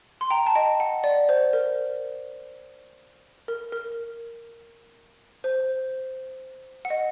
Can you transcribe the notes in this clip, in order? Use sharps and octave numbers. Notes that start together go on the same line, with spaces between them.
C6
G5 A#5
A5
D#5 G5
F#5
D5
C5
A#4
A#4
A#4
C5
F#5
D#5